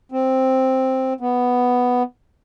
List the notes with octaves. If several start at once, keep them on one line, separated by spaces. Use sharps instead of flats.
C4
B3